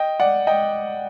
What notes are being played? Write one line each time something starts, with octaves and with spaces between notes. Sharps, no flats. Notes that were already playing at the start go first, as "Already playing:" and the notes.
Already playing: D#5 G5
D5 F#5
D#5 G5